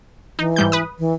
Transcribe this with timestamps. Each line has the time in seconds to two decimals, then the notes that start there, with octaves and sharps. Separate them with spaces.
0.39 E3 D#4
0.56 G#2 G3 G6
0.72 B4 D#6
0.99 E3